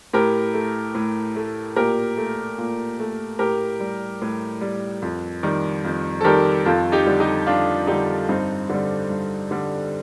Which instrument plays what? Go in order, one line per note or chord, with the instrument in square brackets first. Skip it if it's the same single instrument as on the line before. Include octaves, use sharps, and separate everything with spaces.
[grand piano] A2 G4 A#4
A3
A2
A3
A#2 G4 A#4
A3
A#2
A3
A2 G4 A#4
G3
A2
G3
F2
D#3 G3
F2
A4
D#3 G3 G4 A#4
F2 F4 A4
D#4 G4
D3 G3
D#4 G4
F2 D4 F4
D3 G3 D#4 G4
G2 C4 D#4
D3 G3
G2
D3 G3